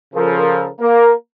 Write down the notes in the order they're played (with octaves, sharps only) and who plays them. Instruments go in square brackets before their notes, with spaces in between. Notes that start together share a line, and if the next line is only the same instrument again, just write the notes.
[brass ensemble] C#3 F3 A4 A#4
A#3 A#4